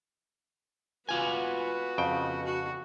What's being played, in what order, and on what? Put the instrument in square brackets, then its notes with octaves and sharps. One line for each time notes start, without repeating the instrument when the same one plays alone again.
[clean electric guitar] B3 F4 G#5 [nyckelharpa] F#4 B4
[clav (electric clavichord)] F2 C#3 G5
[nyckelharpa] F#4